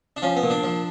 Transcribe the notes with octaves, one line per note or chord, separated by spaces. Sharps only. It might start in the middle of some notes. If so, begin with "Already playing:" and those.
D4
F3 C#4
B3
A#2
D4
F3